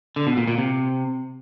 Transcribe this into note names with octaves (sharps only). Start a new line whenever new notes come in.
D3
B2
A#2
A#2
C3